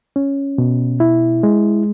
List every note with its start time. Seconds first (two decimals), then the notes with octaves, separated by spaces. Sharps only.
0.16 C#4
0.58 B2
1.00 E4
1.43 G#3